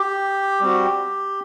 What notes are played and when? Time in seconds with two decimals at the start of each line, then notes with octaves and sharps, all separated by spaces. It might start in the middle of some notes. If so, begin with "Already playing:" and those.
Already playing: G4
0.61 G3 C4 F#4